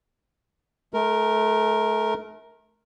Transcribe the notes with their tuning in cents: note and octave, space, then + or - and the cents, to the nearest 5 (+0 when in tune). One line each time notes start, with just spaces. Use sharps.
A3 -30 A#4 +0